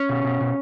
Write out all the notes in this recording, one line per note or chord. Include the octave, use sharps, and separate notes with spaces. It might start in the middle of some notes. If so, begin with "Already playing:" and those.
Already playing: C#4
B2
B2
B2